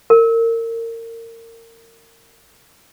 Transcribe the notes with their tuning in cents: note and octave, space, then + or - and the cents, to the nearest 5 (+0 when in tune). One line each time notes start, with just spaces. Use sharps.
A#4 -30